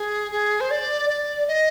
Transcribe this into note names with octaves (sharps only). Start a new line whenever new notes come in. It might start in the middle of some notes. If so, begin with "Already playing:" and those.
Already playing: G#4
G#4
C5
D5
D5
D#5